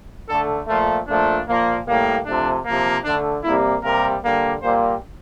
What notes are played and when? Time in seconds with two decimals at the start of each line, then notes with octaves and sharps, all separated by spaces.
0.29 D3 A3 A4
0.68 A#2 F3 A3 F4
1.08 A#2 F3 A3 D4
1.47 A#2 F3 A#3
1.87 A2 G3 A#3
2.26 C3 F3 A3 D4
2.66 C3 F3 A#3
3.05 D3 A3 D4
3.44 C3 G3 A#3 E4
3.83 C3 G3 A#3 A#4
4.23 D3 G3 A#3
4.62 A#2 G3 A#3 C5